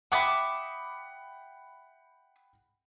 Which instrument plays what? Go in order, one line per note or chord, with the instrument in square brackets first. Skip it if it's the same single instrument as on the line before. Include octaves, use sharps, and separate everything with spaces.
[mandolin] E5 D6 D#6 [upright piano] F#5 G5 B5